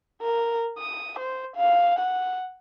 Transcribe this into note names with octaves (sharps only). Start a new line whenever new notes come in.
A#4
D#6
C5
F5
F#5